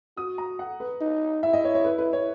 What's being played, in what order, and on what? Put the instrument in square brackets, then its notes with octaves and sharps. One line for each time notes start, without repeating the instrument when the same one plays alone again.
[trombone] F#4 [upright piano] D#6
[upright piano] A#5
F#5
B4
[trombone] D#4
[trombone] E4 [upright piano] E5
[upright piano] D#5
C#5
C#5
B4
B4
C#5